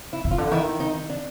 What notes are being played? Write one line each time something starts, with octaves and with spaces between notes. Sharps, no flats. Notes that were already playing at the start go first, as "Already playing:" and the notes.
E4
C#3
F4
D3
D#3 E4
D#4
D4